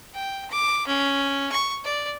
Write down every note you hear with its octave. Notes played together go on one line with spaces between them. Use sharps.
G5
D6
C#4
C#6
D5